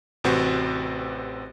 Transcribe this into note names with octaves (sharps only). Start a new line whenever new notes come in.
A1 C3 C4 F#4 B4 C5